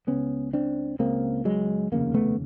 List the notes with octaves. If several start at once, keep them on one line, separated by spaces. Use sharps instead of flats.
C#2 C#3 B3 C#4
C4 D4
C#2 C#3 A#3 C4
F#3 G#3
F1 D#2 C#3 A#3
A3 B3